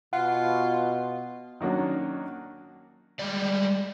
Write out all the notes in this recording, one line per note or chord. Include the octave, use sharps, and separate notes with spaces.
B2 F4 F#5
D#3 F#3 A#3 C#4 D4
G3 G#3 D5